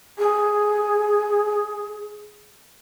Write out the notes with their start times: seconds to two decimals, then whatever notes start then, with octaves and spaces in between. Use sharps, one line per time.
0.18 G#4